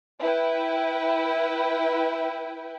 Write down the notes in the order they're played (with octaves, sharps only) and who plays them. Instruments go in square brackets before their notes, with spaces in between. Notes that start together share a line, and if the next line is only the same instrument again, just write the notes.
[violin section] E4 B4 G5